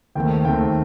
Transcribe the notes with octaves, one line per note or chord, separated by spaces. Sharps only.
D#2 D#3 A3 C4 G5
D#2 D#3 A3 C4 G5